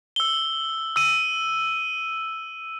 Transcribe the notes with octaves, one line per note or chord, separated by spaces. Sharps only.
E6 G7
E6 D#7